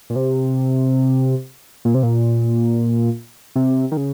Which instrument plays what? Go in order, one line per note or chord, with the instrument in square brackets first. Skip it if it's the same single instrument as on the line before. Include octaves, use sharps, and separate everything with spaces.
[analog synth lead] A#2
C3
A#2
C3
A#2
C3
D#3
C#3